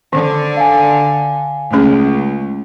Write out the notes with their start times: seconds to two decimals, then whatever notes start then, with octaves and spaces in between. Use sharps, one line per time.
0.13 D3 D#3
0.57 F5 G#5
1.73 C#2 A3 C#4 G#4